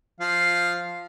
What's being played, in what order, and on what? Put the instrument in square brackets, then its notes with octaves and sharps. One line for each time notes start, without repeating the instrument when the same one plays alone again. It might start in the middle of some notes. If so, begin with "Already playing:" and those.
[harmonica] F3 F5